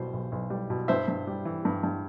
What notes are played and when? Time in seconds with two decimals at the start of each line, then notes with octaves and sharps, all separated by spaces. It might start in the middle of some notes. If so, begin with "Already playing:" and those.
Already playing: B1 B2 G3 C5
0.13 B1
0.32 B1
0.50 G3
0.70 B2
0.88 G2 C5 E5
1.08 G2
1.27 G3
1.45 E3
1.65 G2
1.83 G2